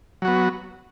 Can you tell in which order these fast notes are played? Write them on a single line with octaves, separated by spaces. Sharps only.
F#3 F#4 B3